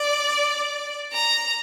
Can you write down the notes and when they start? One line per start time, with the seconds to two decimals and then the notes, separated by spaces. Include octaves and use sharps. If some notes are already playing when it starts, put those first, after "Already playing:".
Already playing: D5
1.13 A#5